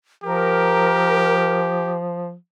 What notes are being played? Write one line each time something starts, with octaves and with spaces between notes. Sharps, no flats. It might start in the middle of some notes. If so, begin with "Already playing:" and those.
F3 G4 A#4